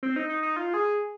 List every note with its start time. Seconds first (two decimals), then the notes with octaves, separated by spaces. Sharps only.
0.03 C4
0.16 D#4
0.29 D#4
0.43 D#4
0.56 F4
0.74 G#4